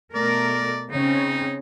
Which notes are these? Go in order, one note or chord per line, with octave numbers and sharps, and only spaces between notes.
B2 A3 A#4 D5
C#3 C4 C#4 D#4